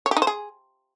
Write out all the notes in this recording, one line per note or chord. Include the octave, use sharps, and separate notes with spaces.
C#5
G4
D#4
C5
G#4